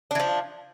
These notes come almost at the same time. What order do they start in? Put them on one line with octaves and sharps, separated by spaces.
D4 E3 F3